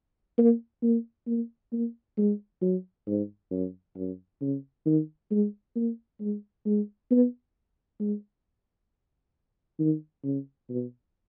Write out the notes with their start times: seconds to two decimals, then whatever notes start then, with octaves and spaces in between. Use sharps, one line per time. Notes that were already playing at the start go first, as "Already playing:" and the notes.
0.38 A#3
0.83 A#3
1.27 A#3
1.72 A#3
2.18 G#3
2.61 F#3
3.07 G#2
3.51 F#2
3.96 F#2
4.41 C#3
4.86 D#3
5.31 G#3
5.76 A#3
6.21 G#3
6.66 G#3
7.11 B3
8.00 G#3
9.79 D#3
10.24 C#3
10.70 B2